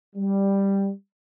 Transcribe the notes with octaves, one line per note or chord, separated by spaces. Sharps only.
G3